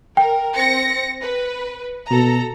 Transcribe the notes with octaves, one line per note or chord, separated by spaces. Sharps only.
A#4 G5
C4 A#6 C#7
B4
B2 A4 A#5